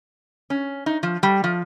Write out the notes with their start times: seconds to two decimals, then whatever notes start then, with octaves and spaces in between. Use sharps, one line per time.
0.50 C#4
0.86 D#4
1.03 F3
1.23 G3
1.44 F3